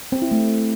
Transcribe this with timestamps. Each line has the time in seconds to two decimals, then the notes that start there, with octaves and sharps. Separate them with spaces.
0.12 C4
0.22 E4
0.31 A3